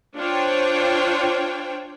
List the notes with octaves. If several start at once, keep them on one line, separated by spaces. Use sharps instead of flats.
D4 F4 C5 C#5 G5